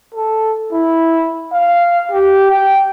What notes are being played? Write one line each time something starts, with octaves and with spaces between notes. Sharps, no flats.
A4
E4
F5
G4
G5